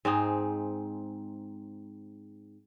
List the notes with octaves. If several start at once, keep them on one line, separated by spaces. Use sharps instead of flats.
G#2 C4 D#4 G#4